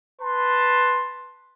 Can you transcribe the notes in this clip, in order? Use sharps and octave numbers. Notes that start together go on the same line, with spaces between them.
B4 A5 C6